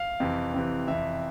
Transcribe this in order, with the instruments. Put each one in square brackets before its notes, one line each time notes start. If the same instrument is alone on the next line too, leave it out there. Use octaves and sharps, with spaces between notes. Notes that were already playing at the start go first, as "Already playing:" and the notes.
Already playing: [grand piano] F5
F2 C3 E3
F2 C3 E3
F2 C3 E3 E5